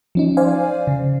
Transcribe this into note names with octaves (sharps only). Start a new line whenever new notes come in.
F3 C#4 D#4
C5 D5 F5 G#5
C#3